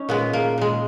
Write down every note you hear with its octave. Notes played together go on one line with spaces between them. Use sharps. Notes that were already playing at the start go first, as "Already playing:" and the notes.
Already playing: C#4 D#4
A#2 G#3 B3
A#3
A#2 G#3